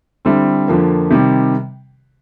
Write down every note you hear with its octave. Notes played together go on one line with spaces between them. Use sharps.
D3 G3 C4 E4 A4
F2 D3 F3 A#3
C3 D#3 G3